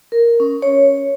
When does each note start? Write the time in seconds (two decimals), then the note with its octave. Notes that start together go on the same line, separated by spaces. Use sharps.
0.12 A#4
0.40 C#4
0.62 C#5